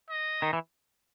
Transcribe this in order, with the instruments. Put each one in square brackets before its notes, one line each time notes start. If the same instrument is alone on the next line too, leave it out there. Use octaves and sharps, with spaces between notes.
[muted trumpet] D#5
[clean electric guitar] D#3
E3